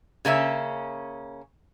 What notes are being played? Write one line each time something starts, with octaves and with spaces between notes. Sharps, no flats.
C#3 A#3 C#4 E5